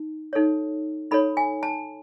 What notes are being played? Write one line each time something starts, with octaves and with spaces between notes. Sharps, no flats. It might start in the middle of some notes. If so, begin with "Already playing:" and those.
Already playing: D#4
D#4 A4 C#5
D#4 A4 C#5 B5
G#5
A5